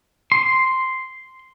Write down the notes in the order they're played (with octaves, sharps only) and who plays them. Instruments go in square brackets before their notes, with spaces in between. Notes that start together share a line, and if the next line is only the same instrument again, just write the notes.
[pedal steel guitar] C6